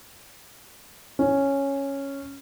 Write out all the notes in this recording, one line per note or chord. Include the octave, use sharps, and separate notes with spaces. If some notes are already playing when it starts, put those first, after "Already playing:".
C#4